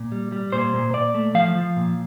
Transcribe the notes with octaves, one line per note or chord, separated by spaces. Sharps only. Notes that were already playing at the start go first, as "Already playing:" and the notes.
Already playing: A#2
G3
G3
A#2 C5
A#2
A#2 D5
A3
F3 F5
F3
A#2